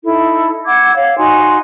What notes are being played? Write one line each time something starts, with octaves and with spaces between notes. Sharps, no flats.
D#4 E4 A4
F#5 D6 E6 G#6
C#5 F5
D#4 F#4 G#5 C6